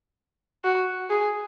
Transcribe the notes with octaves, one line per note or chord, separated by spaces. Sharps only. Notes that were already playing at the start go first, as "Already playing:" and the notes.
F#4
G#4